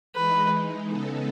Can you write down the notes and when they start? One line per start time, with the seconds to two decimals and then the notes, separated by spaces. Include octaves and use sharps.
0.15 E3 G#3 D#4 B4
0.88 C#3 G#3 B3 D#4 A4